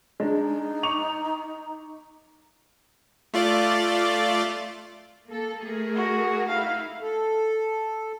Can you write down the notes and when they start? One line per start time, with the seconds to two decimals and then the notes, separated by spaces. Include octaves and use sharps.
0.20 G#3 D4 D#4
0.83 C#6 D6 F7
3.34 A3 F4 D5
5.28 A#3 A4
5.64 A3 G#4 A#4
5.95 F#4
6.49 D#4 E4 F5
7.01 A4